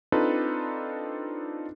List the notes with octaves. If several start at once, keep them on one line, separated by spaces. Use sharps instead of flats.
C4 D4 D#4 F4 A4 B4